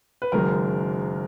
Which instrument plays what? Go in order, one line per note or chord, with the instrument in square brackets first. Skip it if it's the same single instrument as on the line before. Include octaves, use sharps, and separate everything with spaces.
[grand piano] B4
F#1 F#2 D#3 G#3 A#4